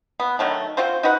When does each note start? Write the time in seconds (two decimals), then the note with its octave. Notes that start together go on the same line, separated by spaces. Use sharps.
0.20 B3
0.39 D3 D#3 F#3 A3
0.77 C4 F4 F#4 C5
1.03 D#4 F#4 B4 F#5